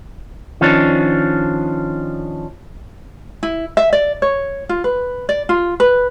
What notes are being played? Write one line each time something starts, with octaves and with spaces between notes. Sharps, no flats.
D#3 F3 C#4 D4
E4
E5
D5
C#5
F4
B4
D5
F4
B4